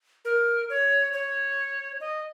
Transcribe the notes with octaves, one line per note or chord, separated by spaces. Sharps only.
A#4
C#5
C#5
D#5